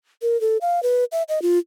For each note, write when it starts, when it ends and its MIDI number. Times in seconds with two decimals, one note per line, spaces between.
0.22 0.39 70
0.41 0.58 69
0.61 0.82 77
0.83 1.05 71
1.12 1.23 76
1.29 1.42 75
1.42 1.59 65